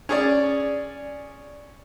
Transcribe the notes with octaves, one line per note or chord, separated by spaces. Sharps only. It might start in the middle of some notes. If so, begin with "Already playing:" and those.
C#4 G#4 D5